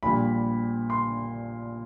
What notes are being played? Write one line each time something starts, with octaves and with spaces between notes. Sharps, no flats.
A#1 A#2 G3 B5
C6